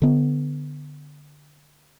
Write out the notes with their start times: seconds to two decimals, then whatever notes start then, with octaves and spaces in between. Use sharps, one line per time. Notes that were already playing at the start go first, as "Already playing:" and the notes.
0.02 D3 B3